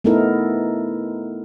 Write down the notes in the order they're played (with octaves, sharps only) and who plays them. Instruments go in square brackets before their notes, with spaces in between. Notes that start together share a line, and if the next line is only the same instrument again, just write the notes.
[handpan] A3 B3 D#4 E4 A4 A#4